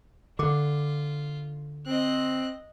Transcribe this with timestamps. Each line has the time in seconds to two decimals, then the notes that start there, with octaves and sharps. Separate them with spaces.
0.39 D3 F4 D6
1.86 C4 D#5 F#6